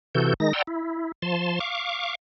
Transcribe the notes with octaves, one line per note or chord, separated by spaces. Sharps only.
C3 E3 F#4 A4 G6
D#3 G#3 D#4 A#6
D5 F#5 G5 A#5 C6 E6
E4
F3 A5 C6
F5 C#6 D6